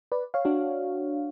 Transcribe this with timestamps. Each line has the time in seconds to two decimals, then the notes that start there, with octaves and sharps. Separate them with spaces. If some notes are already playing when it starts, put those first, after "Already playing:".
0.12 B4 D5
0.34 C#5 F5
0.45 D4 F#4